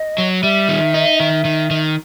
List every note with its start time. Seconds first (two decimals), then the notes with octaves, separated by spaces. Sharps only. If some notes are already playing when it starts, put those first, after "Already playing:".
Already playing: D#5
0.18 F#3
0.43 G3 E5
0.69 D#3
0.94 D#4
1.20 D#3
1.45 D#3
1.71 D#3